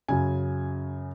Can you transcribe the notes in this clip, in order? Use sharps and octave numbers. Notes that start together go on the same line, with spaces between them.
F#2 C#3 G#5